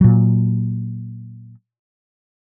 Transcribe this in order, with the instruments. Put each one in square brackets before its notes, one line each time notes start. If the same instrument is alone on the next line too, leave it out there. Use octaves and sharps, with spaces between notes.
[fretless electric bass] A#2 F#3